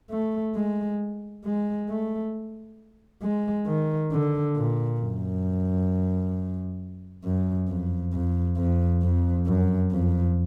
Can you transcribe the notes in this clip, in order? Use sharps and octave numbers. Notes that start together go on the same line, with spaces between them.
A3
G#3
G#3
A3
G#3
D#3
D3
A#2
F#2
F#2
F2
F2
F2
F2
F#2
F2